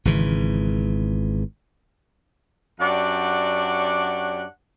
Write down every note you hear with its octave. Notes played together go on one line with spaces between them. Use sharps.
G#1 C#3 E3
F#2 D4 G4 C#5 D5 F#5